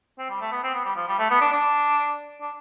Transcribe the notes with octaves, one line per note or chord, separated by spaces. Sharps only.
C4
G3
A3
B3
C4
B3
G3
F3
G3
A3
B3
D4
D4
D4